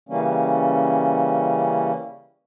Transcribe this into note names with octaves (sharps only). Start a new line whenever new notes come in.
C#3 E3 G3 A#3 C#4